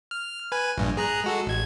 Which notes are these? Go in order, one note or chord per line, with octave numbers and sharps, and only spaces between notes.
F6
B4 G#5
A#1 G2 A#2
G#4 A#5 F#6
G#3 F#4 A4
A1 G#6